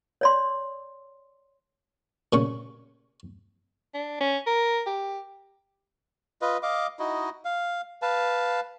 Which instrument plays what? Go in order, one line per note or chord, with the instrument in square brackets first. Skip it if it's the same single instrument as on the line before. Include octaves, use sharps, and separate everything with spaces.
[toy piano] C#5 D5 C6
[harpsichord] A#2 C#3 C#6
[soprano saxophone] D4
C#4
A#4
G4
[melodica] F4 B4 D#5
D#5 F5 D6
D#4 E4 F#4 D#5
F5
B4 F5 A5